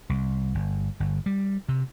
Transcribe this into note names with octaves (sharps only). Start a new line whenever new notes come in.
C2
G1
G1
G3
C3